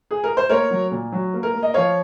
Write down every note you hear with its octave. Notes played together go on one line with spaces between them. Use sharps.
G#4
A#4
C5
A#3 A#4 C#5
F#3
A#2
F#3
A#3
A#4
A#3
D#5
F3 C#5 F5